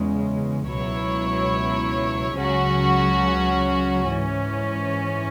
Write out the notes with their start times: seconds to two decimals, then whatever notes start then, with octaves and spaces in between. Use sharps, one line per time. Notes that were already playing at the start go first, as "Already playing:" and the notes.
Already playing: E2 C#3 G#3
0.66 C#2 B2 F#3 E4 C#5
2.36 C#2 C#3 F#3 C#4 F#4
4.05 G#2 E3 C#4